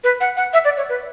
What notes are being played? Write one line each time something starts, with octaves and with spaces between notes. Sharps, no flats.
B4
F#5
F#5
E5
D5
C#5
B4